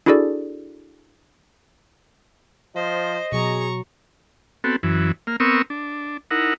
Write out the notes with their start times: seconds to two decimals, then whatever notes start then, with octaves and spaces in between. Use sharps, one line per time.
0.06 D4 E4 F#4 G#4 A4 D5
2.76 F3 C5 D#5
3.32 B2 F#3 G#4 A#5 C#6
4.64 B3 C4 F#4 A4
4.83 F#2 E3
5.27 A#3 F6
5.40 B3 C4 A#4 C#6 D#6 E6
5.70 D4
6.31 D#4 E4 A#4 F#5